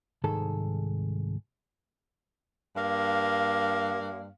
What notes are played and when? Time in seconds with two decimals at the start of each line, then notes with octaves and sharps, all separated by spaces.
0.24 C2 G#2 D#3 G#4 A4 A5
2.76 G2 A#3 F5